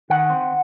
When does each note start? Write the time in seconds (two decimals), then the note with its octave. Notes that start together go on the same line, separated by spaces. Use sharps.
0.10 D#3 F#5
0.30 C4